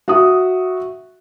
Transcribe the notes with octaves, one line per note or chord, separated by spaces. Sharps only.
F#4 E5 D#6